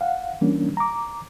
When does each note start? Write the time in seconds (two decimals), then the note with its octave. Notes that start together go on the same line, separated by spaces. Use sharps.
0.01 F5 F#5
0.41 E3 G3 A#3 C#4 D4
0.77 A#5 D6